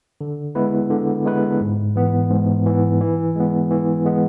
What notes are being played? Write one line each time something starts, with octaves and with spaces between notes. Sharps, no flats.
D3
G#3 B3 E4 B4
D3
G#3 B3 E4 B4
G#2
E3 B3
G#2
E3 B3
E3
G#3 B3
E3
G#3 B3